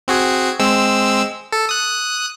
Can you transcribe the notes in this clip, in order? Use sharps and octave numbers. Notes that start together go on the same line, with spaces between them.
C4 F#4 G#4
G#3 C4 E6
A4
D#6 F#6